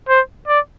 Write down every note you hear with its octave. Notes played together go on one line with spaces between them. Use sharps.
C5
D5